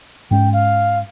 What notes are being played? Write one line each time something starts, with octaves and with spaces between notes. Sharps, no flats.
G#2 G#3 C#4 G5
F5